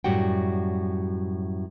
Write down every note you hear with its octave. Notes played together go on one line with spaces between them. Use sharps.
F#2 A2 G3 F#4 F#5 G5